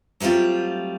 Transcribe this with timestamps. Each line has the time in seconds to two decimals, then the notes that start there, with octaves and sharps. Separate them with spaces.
0.20 F#3 G3 A3 C4 F4